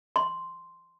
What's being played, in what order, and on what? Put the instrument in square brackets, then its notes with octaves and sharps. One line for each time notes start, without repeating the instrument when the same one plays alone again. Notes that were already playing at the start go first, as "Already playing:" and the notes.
[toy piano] C6